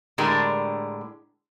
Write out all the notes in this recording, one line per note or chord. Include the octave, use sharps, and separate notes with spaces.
A2 D3 G#3 D4 G4 A#4